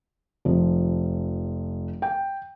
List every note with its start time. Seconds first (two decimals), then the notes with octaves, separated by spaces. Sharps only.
0.45 F1 F3
2.02 G5